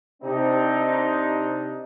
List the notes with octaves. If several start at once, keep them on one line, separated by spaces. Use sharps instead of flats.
C3 C4 D4 D#4